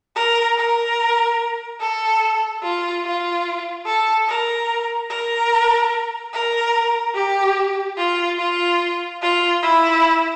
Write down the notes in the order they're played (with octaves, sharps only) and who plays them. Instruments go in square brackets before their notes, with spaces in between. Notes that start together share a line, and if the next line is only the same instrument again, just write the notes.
[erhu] A#4
A#4
A4
F4
F4
A4
A#4
A#4
A#4
G4
F4
F4
F4
E4